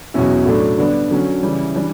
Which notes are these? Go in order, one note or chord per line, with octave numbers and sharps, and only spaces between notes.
E2 B2 F#3 C#4 E4
A2 F#3 A3 D4
D3 G3 B3 D4
D3 F#3 C#4
C#3 E3 G3
E3 G3 D4